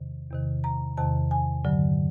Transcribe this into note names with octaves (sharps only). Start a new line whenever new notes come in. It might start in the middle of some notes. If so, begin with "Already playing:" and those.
Already playing: E2 C3 D#3
E2 C3 D#3
A#5
E2 C3 D#3 A5
G#5
G2 D3 F#3